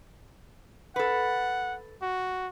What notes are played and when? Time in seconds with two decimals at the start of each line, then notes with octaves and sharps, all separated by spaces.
0.96 A4 B4 F#5
2.02 F#4